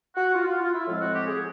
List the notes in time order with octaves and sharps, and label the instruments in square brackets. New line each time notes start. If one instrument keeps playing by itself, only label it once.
[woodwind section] F#4
F4
F4
F4
E4
A2 F3 G#3 C4 F4
F#4
G4
G#4